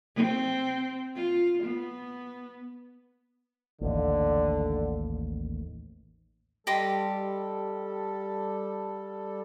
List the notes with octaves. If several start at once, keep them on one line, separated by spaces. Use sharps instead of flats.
C4
F4
B3
A1 D#2 D3
G3 G4 A4 D#5 C6